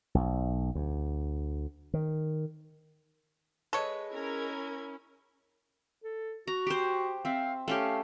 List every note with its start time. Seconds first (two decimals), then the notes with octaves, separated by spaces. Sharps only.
0.15 B1
0.75 D2
1.94 D#3
3.73 G#3 A4 B4 C#5
4.12 C#4 E4 A#4 G#6
6.04 A4
6.48 F#4 A#5
6.67 G4 C5
7.25 C4 E5 F5
7.68 A3 C#4 G4 F5